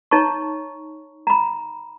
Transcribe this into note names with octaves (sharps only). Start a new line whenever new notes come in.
D#4 C#5 A5 A#5 C#6
A#5 B5